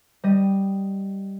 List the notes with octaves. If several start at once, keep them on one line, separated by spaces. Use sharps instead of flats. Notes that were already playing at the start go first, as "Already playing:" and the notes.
G3 D#5